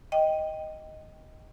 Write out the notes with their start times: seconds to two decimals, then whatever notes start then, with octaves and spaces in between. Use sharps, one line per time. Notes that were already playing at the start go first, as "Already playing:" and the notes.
0.12 D#5 G5